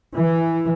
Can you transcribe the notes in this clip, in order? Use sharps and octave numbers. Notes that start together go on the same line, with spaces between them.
E3